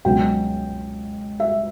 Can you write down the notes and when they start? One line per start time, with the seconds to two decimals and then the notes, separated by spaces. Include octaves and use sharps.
0.05 C#2 B2 F#3 C#4 G5
1.40 E5